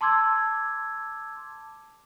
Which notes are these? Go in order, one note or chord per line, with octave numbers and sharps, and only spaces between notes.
A5 C6 D6 E6 G#6